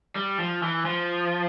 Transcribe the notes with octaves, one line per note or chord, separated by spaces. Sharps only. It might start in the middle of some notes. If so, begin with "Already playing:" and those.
G3
F3
E3
F3